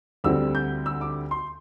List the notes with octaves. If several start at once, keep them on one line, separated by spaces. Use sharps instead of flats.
D2 D3 G3 C4 E6
G6
E6
D6
C6